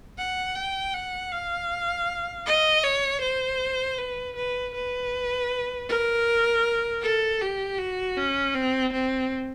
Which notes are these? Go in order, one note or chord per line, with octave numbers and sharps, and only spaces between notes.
F#5
G5
F#5
F5
D#5
C#5
C5
B4
B4
B4
A#4
A4
G4
F#4
C#4
C4
C4